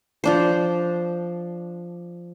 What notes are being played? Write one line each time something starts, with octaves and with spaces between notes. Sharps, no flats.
F3 D4 C5